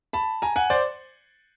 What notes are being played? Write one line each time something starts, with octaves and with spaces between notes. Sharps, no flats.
A5 B5
G#5 A#5
F#5 G#5
C5 D5